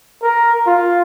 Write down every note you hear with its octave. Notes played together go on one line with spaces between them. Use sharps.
A#4
F4